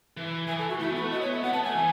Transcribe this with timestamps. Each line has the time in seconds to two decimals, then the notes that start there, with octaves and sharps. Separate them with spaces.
0.17 E3
0.48 E3 G#5
0.59 A4
0.69 F#4
0.79 A3 E4
0.90 B3
0.95 F#4
1.01 A3
1.11 B3 D#5
1.22 C#5
1.32 E5
1.43 B3 F#5
1.53 B3 A5
1.64 A3 G#5
1.75 E3